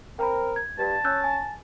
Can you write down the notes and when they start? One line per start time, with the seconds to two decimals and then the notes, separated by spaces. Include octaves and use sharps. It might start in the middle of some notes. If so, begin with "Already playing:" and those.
0.19 C4 A#4 G5 A#5 B5
0.56 G#6
0.79 G2 A5
1.04 C#4 E6 F#6 G6
1.24 G#5